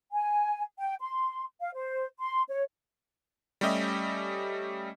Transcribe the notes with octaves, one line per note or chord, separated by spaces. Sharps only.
G#5
G5
C6
F5
C5
C6
C#5
G3 A3 C#4 G4 D#5 E5